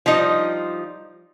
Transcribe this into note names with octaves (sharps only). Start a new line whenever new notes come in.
F3 G3 D#4 D#5